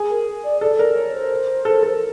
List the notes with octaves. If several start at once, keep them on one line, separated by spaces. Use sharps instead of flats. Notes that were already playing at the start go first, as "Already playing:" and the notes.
Already playing: G#4
A#4
D5
A4 D5
A#4 D5
C#5
C5
A4
A4